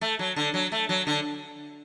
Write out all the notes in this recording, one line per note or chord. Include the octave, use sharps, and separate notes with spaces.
A3
F#3
D3
F#3
A3
F#3
D3